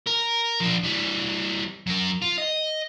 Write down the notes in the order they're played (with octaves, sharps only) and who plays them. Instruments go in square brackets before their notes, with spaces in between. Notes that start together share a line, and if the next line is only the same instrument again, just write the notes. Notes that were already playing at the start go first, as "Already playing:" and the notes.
[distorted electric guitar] A#4
F3 D4
E3 G3
F#3 A#4
F4
D#5